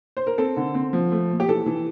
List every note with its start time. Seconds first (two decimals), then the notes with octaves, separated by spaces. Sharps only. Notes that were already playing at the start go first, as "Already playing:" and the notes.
0.17 C5
0.27 A#4
0.38 C4 A4
0.57 D3
0.74 C4
0.93 F3
1.12 A3
1.30 A#2
1.40 G4
1.49 E3 A4
1.66 E3